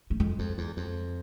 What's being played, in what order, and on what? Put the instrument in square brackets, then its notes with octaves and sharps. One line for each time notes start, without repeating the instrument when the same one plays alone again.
[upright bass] A3
[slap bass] F2 [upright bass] G#3
[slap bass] F2
E2
F2